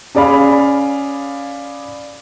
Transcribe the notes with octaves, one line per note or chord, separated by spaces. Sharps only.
C#4 G#4 D5 F5 B5